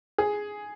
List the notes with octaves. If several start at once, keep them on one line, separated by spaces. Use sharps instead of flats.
G#4